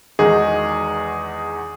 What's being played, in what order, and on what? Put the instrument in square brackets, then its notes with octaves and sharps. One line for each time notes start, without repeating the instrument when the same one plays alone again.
[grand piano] E2 D#3 G#3 D#4 F#4 [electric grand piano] G#4